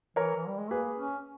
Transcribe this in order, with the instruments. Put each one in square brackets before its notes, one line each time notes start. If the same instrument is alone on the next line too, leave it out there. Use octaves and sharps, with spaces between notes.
[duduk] E3 [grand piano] A#4 C#5
[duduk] E3
G3
G#3
[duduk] A#3 [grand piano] G#4 B4
[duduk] C#4